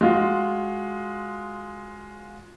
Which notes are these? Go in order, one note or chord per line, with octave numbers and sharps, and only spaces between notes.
G#3 F4 F#4